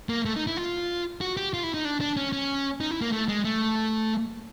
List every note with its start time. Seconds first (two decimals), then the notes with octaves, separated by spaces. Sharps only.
0.09 A#3
0.25 A3
0.36 D#4
0.47 E4
0.57 F4
1.21 F#4
1.37 G4
1.54 F4
1.63 E4
1.74 D#4
1.85 D4
2.01 D4
2.17 C#4
2.33 C#4
2.81 D#4
2.91 E4
3.02 A#3
3.12 A3
3.28 G#3
3.44 A3